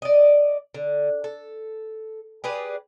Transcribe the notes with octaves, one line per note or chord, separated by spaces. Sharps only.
D5 D#5
D3
A4
G4 G#4 B4 D5